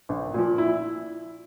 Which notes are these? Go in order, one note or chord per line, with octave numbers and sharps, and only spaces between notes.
A#1
A#2 F3
E4